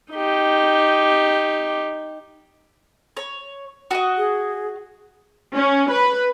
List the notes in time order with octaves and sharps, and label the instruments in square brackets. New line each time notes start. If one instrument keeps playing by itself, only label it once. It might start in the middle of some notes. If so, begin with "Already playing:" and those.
[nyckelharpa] D#4 G4
[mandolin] C#5
F#4 D#5
[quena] G#4
[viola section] C#4
B4